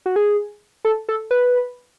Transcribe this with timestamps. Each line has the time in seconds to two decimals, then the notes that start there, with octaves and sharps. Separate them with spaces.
0.06 F#4
0.16 G#4
0.85 A4
1.09 A4
1.31 B4